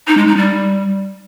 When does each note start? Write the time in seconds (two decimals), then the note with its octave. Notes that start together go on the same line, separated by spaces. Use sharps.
0.07 D#4
0.17 G#3
0.27 D#4
0.37 G3